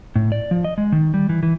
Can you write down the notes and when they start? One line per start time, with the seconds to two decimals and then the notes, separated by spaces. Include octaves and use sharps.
0.16 A2
0.32 D5
0.51 F3
0.64 D#5
0.78 G#3
0.92 D#3
1.14 G3
1.29 E3
1.43 E3